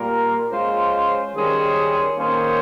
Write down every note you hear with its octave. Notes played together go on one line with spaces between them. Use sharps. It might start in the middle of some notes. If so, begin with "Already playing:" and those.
Already playing: A#2 G3 A#3 F4 A#4
G#3 C#4 F4 C5
D#3 G3 C#4 G#4 C5
D#3 A#3 C#4 G#4 C5